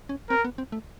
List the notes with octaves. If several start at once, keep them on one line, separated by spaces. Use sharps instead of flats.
C#4
C4 A#4
B3
C4
A3